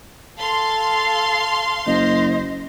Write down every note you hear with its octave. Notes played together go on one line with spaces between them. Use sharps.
A4 F5 C6
F#1 C5 D#5